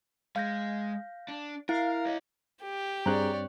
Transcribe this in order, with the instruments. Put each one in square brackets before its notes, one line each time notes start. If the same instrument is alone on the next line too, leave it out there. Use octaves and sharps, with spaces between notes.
[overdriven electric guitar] G#3 [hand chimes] F5 G6 A#6
[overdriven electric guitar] D4
[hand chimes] E4 [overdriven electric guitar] A#4 [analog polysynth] F5
[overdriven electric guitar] C#5 D#5
[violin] G4
[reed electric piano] G2 C4 F#6 [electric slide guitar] G#4 A#5 [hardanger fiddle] C#5 D5